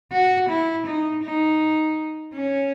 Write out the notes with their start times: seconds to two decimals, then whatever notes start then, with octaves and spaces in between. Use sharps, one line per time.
0.13 F#4
0.50 E4
0.87 D#4
1.23 D#4
2.34 C#4